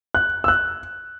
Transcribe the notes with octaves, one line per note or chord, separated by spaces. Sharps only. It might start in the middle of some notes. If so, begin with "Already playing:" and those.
F#6
E6
F#6